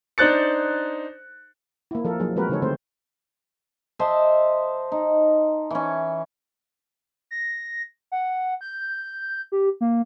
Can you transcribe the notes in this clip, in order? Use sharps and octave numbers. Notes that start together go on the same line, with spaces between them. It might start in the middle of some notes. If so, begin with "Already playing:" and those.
D4 D#4 C5 F#6 A6 C#7
A#3 E4
F3 A4 A#4
F3 F#3 A#3 D#4 G#4
F3 G#3 C4 F#4 A#4 B4
C#3 E3 D#4 G#4 A4 C#5
D3 A3 C4 C5
C5 D#5 E5 A5
D#4
E3 C#4
A#6
F#5
G6
G4
A#3